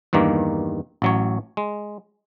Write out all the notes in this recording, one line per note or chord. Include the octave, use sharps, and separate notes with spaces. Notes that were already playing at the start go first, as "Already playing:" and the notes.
E2 G2 D#3 A#3
A1 F#3 C#5
G#3